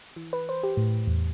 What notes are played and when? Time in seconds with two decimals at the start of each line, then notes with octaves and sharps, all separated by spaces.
0.16 E3
0.33 B4
0.49 C5
0.63 G4
0.77 A2
1.07 E2